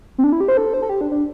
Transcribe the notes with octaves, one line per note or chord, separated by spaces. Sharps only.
C4
D4
E4
G4
C5
A4
C5
A4
G4
D4
D4